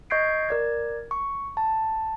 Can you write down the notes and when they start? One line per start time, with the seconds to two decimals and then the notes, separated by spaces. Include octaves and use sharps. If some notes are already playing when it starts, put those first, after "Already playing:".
0.10 D#5 C#6 G6 G#6 C7 D7
0.49 A#4 D5 G#6
1.11 C#6
1.57 A5